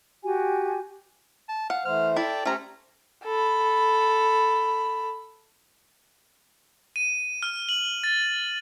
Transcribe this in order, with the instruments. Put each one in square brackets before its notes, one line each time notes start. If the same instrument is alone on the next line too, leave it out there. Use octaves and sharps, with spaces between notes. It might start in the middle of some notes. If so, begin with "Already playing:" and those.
[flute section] F#4 G4 G#5
[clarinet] A5
[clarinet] F5 [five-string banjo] F#5
[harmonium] E3 A3 C5 [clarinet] F6
[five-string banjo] E4 [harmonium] A4 G5 A5 [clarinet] D5
[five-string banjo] A3 A#5 [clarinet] C#4 [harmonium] G4 C5
[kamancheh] A4 B5
[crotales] D#7
F6
F#7
A6